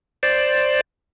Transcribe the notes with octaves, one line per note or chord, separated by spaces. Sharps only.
C5 D5